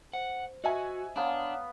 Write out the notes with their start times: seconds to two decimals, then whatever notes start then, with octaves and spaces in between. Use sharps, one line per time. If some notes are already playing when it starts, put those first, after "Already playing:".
0.13 C5 F#5
0.64 F#4 D#5 E5 G#5
1.16 B3 D4 B4 C#5 F5 F#5 A#5